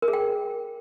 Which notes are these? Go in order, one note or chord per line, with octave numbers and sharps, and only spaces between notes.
A#4
G#4
G5